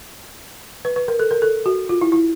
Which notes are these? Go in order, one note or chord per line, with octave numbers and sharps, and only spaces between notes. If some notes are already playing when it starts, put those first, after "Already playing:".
B4
B4
A#4
A4
A#4
A4
F#4
F4
E4
E4